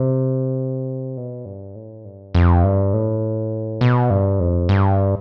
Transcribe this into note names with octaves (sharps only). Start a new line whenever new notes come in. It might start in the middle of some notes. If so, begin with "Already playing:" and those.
Already playing: C3
B2
G2
A2
G2
F2
G2
A2
B2
G2
F2
G2